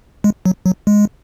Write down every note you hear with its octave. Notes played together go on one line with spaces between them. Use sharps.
G#3
F#3
F#3
G#3